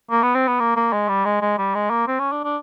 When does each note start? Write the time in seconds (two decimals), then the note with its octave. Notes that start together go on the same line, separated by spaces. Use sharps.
0.11 A#3
0.23 B3
0.35 C4
0.48 B3
0.60 A#3
0.76 A#3
0.92 G#3
1.09 G3
1.25 G#3
1.42 G#3
1.58 G3
1.75 G#3
1.90 A#3
2.07 C4
2.19 C#4
2.32 D4
2.44 D4